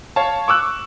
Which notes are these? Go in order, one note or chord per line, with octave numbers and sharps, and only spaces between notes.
C#5 F5 A5
C#6 D6 E6 F#6